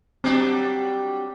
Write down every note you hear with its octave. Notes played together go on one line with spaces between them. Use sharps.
F#3 G3 C4 D4